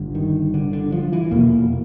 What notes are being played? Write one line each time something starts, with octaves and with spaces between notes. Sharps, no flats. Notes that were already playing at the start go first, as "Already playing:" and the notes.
Already playing: G1 G2 D3
D#3
D3
D3
F3
E3
F1 E2 B2 A#3